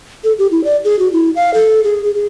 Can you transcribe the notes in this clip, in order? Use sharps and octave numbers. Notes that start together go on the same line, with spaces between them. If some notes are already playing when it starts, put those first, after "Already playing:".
A4
G4
E4
D5
G#4
F#4
E4
F5
A4
G#4
G#4
G#4